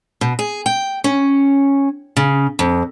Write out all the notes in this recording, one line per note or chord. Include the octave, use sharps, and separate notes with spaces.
B2
G#4
G5
C#4
C#3
F2